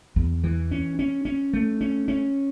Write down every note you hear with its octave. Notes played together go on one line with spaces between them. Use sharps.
E2
E3
C#4
C#4
C#4
A3
C#4
C#4